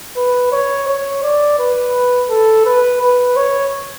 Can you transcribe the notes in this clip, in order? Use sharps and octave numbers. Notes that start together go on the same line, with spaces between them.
B4
C#5
C#5
D5
B4
A4
B4
B4
C#5